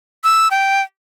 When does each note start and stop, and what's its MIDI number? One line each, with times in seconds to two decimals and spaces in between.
0.24 0.48 88
0.51 0.82 79